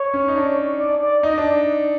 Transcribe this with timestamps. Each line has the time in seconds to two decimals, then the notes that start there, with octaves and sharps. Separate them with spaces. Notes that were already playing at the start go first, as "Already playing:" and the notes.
Already playing: C#5
0.14 C#4
0.28 D#4
0.36 D4
0.79 D5
1.02 D5
1.23 D#4 D#5
1.38 D4